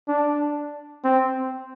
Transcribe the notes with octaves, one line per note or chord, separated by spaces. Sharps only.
D4
C4